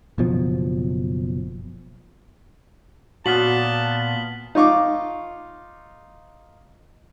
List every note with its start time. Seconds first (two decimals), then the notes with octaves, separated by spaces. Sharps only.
0.18 F#1 B2 F3
3.26 A#2 B3 F#4 A5 F6 B6 F#7
4.55 D#4 F4 C#6 D6